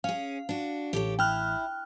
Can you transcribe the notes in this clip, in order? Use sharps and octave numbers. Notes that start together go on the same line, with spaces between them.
C#4 G#4 F5
D4 F#4
A1 G4 A4 C#5
E4 G5 F6 F#6